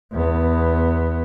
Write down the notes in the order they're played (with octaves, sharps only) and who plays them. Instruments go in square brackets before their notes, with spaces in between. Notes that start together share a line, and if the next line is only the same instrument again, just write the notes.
[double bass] E2 B3